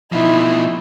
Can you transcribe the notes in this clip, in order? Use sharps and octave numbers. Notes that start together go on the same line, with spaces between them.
B2 F3 D#4 E4